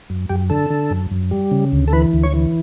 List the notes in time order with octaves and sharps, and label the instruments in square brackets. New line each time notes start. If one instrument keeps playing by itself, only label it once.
[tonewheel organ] F#2
F#2 G4
D3 A4
D3
F#2
F#2
G3
C#3
D2
A4
E3 B4
D2
C#5
E3